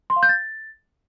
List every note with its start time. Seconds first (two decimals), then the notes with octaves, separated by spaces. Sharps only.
0.10 C6
0.16 F5
0.23 G6
0.29 A6